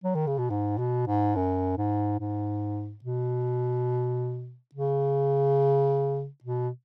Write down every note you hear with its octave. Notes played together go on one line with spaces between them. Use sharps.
F#3
D#3
C#3
B2
G#2
B2
G#2
F#2
G#2
G#2
B2
C#3
B2